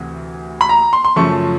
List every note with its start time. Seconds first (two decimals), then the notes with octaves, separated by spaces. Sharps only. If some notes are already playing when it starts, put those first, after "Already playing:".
Already playing: D2 C3 E3
0.61 B5
0.69 A#5
0.93 C6
1.05 C6
1.16 F#2 C#3 F3 A3 C#6